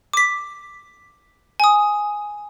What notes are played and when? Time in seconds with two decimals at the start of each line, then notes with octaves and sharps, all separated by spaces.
0.13 D6 B6
1.60 G#5 D#6